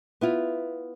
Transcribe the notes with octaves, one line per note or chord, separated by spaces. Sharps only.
B3 E4 F4